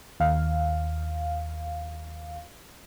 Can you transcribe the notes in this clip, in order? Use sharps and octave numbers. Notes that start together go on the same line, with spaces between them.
D#2 F5